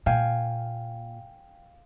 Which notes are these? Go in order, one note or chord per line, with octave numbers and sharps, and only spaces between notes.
A#2 F5 G5 G#5